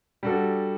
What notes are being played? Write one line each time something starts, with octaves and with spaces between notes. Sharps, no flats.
G3 D4 F#4 A4